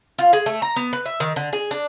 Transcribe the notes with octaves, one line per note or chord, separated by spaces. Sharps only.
F4
G#4
A3
A#5
B3
B4
E5
D#3
D3
G#4
D4